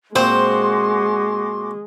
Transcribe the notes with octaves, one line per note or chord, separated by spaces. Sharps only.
A#2 G#3 C4 F#4 C5 C6 D6